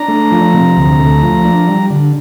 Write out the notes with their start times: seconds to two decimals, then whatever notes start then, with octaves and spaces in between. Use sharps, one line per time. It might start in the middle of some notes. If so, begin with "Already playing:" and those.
Already playing: D4 A#5
0.08 A3
0.31 F3
0.54 C3
0.77 D2
0.99 A3
1.22 F3
1.44 D4
1.67 G3
1.90 D3